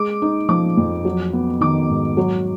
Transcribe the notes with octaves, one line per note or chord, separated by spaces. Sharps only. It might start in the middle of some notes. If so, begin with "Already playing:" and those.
Already playing: G#3 D6
D#4
F3 D6
F2
F#3
B3
D#3 D6
G#2
F#3